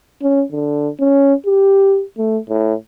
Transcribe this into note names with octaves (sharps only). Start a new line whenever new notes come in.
C#4
D3
C#4
G4
A3
A2